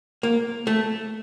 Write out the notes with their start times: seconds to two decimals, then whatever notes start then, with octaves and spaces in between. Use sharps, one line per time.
0.23 A#3
0.67 A3